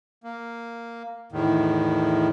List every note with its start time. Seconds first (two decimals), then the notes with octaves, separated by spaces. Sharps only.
0.23 A#3
1.32 E2 A2 D#3